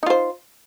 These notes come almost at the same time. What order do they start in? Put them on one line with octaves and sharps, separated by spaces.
D#4 F4 C5